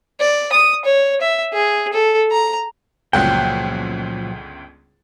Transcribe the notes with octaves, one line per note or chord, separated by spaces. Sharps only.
D5
D#6
C#5
E5
G#4
A4
A#5
G1 C#2 A#2 F3 F#3 F#5 G5